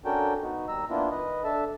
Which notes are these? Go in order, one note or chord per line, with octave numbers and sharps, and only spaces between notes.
C#4 D4 F#4 A4 A#4 G5
B3 D#4 F#4
D#2 G3 A#5 E6
A#3 B3 D4 E4 F4
D#3 B4 D#5
D4 A4 E5 A5